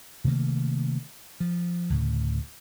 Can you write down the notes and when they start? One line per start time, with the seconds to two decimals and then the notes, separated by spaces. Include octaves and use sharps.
0.24 C3 D#3 A3 A#3
1.40 F3
1.90 D2 A2 C#3